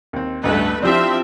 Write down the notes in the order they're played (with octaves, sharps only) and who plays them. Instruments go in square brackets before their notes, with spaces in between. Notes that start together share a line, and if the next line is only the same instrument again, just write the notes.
[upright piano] D#2 C4
[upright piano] A1 D2 G2 [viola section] A3 B4
[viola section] F3 C4 E5 [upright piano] D4 E4 G4